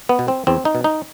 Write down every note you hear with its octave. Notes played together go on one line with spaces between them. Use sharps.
B3
B2
C4
E2 C4
D#4
B2
D#4